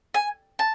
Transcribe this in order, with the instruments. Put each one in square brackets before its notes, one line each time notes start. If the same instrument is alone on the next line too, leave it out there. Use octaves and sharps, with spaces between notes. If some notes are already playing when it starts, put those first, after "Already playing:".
[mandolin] G#5
A5